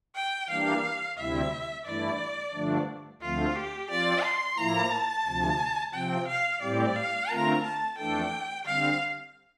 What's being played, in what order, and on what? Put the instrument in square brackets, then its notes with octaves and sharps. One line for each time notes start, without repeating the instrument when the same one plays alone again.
[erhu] G5
[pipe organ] E3 G3 A#3 D4 G4 [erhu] F5
[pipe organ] D2 C3 G3 C4 E4 [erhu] E5
[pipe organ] G2 E3 A3 E4 [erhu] D5
[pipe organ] G2 D3 F3 A3 D4
[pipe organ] D2 D3 F3 A3 C4 [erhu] F4
[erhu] G4
[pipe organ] F3 C4 F4 [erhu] D5
[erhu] C6
[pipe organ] A2 F3 A#3 E4 [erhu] A#5
[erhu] A5
[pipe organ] D2 C3 F3
[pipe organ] C3 F3 C4 [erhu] G5
[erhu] F5
[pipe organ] A2 G3 C4 G4 [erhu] D5
[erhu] F5
[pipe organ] D3 A3 C4 F4 A#4 [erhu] A#5
[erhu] A5
[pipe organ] F2 E3 A3 D4 A4 [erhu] G5
[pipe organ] D3 G3 C4 [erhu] F5